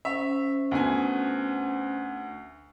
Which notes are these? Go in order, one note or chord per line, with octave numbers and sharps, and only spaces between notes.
C#4 C5 E5
D2 B3 G#5